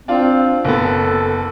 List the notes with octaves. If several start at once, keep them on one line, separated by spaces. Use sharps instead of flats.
C4 D4 F4
F#1 B3 A4